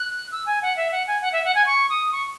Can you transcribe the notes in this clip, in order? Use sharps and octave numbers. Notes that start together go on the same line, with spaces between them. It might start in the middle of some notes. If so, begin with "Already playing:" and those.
Already playing: F#6
E6
G#5
F#5
E5
F#5
G#5
F#5
E5
F#5
G#5
C#6
D#6
C#6